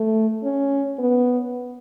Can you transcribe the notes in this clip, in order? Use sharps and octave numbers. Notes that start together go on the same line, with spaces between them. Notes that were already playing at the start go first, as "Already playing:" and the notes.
Already playing: A3
C#4
B3